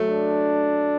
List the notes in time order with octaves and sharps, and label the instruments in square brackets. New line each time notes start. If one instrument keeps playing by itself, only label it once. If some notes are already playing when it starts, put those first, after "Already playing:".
Already playing: [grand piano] F#3 A3
[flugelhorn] D4